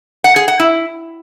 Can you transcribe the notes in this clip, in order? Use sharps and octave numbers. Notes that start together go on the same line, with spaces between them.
F#5
G#4
F#5
E4